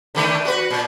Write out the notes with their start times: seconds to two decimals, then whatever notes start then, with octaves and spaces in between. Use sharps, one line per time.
0.15 D3 D#3 A3
0.45 F#4 B4
0.71 A#2